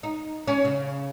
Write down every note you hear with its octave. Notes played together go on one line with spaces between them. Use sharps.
D#4
C#4
C#3